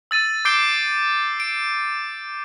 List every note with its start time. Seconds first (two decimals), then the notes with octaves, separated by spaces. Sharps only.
0.11 E6 A6 D#7
0.45 D6 G6 C7 D7 G7
1.40 D7